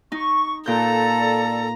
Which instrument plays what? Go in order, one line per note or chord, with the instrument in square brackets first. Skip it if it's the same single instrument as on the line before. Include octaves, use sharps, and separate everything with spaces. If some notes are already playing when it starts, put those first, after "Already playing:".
[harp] D#4 [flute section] C#6
[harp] A#2 G6 [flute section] A4 D5 [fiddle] A#5